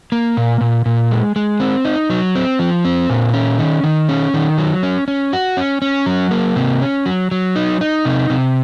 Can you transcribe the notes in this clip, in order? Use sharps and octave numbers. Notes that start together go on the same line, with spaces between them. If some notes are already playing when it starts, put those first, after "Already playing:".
A#3
A#2
A#2
A#2
G#3
G#3
C4
D#4
F#3
C4
F3
C4
A#2
C#4
D#3
D#3
C#4
D#3
F#3
C#4
C#4
F#4
C#4
C#4
F#3
A#3
C3
C#4
F#3
F#3
D#4
D#4
C3
C3